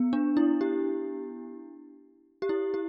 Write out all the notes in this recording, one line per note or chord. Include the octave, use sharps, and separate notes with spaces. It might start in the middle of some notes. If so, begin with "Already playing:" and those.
Already playing: B3
D4
E4
G4
G4
E4
G4